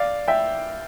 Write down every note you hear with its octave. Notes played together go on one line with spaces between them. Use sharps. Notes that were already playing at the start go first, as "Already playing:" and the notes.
Already playing: D5 F5
E5 G5